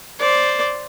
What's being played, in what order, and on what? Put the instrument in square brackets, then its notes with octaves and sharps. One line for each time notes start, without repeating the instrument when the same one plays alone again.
[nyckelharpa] C5 D5